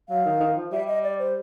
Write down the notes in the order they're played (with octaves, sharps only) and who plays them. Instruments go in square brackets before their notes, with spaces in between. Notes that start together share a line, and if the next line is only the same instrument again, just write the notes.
[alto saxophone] F#3 [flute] F5
[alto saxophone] D#3
D#3
F3
[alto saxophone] G3 [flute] E5
[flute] D#5
D5
C5